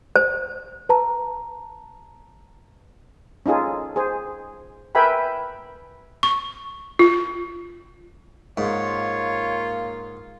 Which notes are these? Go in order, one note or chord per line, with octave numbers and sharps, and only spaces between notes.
C5
B4 A5 A#5
C#4 D#4 F4 G#4 A4
G#4 C5
A#4 B4 E5 G5 G#5 B5
C#6
F4
G#2 A#3 F4 C#5